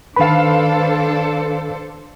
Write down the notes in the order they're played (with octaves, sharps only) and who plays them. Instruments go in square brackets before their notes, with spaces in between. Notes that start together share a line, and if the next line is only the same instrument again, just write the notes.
[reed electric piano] D#3 B5 [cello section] D4 A4 C5 [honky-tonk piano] B4 F5